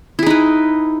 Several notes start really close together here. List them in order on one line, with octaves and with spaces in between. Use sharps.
E4 G#4 D#4 B4